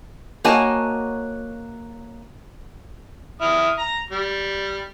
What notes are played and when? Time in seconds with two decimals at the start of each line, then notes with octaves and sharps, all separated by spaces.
0.44 A#3 F#4 C#5 D#5 G#5 A5
3.41 E4 D#6 F6
3.78 A#5
4.11 G3